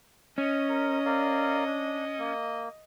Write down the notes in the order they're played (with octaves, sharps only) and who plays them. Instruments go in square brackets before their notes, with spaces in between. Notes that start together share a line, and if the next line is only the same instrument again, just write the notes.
[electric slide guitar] C#4 [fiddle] D#5
[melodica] A#4
A#4 D5 F5
D4
A#3